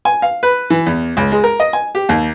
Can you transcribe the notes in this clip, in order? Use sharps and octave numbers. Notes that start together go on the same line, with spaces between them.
G#5
F5
B4
E3
E2
C#2
G#3
A#4
D#5
G#5
G4
D#2